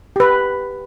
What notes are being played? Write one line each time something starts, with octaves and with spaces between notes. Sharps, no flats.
G4 B4